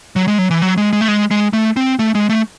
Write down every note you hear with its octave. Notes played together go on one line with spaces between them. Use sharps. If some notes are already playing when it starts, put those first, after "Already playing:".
F#3
G#3
F#3
E3
F#3
G#3
G#3
A3
G#3
G#3
A3
C4
A3
G#3
A3